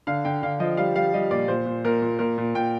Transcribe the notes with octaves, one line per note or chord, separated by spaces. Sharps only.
D3 F5
D3 G5
D3 F5
F3 D#5
G3 F5
G3 F5
G3 D#5
A#2 D5
A#2 C5
A#2
A#2 A#4
A#2
A#2 A#4
A#2
A#2 G5